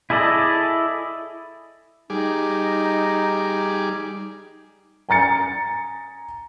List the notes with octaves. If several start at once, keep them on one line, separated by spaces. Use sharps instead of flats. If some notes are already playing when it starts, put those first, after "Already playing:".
E4 G#4 A4 D5 D#5
G3 D#4 G#4 D6
G#5 A#5 A6 C#7